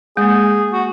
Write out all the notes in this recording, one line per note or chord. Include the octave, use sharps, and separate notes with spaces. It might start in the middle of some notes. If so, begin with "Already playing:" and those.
G#3 A#3 G#4
F#4